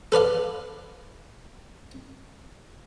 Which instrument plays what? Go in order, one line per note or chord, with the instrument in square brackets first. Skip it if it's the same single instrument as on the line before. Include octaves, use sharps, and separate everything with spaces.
[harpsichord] A4 B4 D5 F5